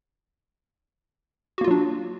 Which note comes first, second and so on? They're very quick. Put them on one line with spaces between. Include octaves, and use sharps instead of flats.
F#4 A#3 F4 F#3 D4